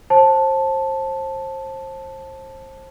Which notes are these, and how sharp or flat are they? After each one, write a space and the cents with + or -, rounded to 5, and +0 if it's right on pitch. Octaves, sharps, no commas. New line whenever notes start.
C5 +30 A5 +0